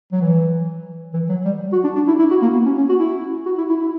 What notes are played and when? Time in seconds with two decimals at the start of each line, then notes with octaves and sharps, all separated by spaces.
0.12 F#3
0.22 E3
1.14 E3
1.29 F#3
1.45 G3
1.72 F#4
1.84 D4
1.95 D4
2.08 E4
2.19 E4
2.31 F#4
2.42 A#3
2.53 B3
2.65 C#4
2.77 C#4
2.89 F#4
2.99 E4
3.46 F#4
3.58 E4
3.69 E4
3.81 E4